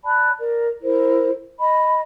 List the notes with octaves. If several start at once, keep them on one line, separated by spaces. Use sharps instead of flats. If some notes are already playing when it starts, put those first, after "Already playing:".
D5 A5 B5 F#6
A#4 D5
E4 A#4 C5
D#5 B5